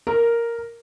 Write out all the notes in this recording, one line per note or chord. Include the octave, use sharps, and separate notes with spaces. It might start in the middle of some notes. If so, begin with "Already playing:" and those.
A#4